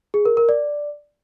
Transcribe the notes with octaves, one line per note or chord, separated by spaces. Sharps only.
G#4
A#4
A#4
D5